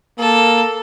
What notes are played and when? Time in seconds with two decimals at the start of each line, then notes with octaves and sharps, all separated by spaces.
0.19 A#3 A4